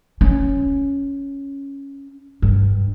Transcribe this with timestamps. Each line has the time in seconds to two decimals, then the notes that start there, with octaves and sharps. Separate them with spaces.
0.21 C#4
2.42 G2